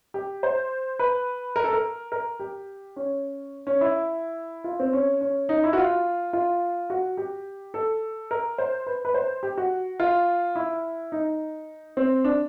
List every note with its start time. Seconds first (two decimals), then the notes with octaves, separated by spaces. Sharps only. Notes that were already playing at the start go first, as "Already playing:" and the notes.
0.14 G4
0.43 C5
0.99 B4
1.56 A#4
1.64 A4
1.73 A#4
2.12 A#4
2.40 G4
2.96 C#4
3.67 C#4
3.81 E4
4.64 F4
4.80 C4
4.93 C#4
5.21 C#4
5.49 D#4
5.64 E4
5.73 F#4
5.77 F4
6.33 F4
6.90 F#4
7.17 G4
7.74 A4
8.31 A#4
8.58 C5
8.86 B4
9.05 B4
9.14 C5
9.43 G4
9.57 F#4
10.00 F4
10.56 E4
11.12 D#4
11.97 C4
12.25 D4